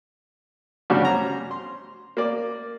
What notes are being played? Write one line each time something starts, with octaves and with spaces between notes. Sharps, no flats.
C#3 F#3 G3 D4 F#4 C#5
C#4 A#5
C6
A#3 D5